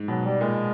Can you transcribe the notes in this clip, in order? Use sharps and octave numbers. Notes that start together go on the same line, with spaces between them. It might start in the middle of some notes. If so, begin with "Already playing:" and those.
Already playing: G#2
B2 F#3
G3
A#2 G#3